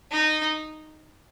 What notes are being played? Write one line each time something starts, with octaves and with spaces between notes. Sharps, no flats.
D#4